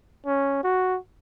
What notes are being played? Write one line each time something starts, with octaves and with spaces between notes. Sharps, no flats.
C#4
F#4